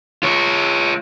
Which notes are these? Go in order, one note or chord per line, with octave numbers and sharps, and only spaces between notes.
F4 C#5